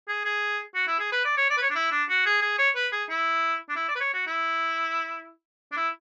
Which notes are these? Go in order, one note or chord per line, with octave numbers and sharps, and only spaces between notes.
G#4
G#4
F#4
E4
G#4
B4
D5
C#5
D5
B4
C#5
D4
E4
D4
F#4
G#4
G#4
C#5
B4
G#4
E4
D4
E4
D5
B4
C#5
F#4
E4
D4
E4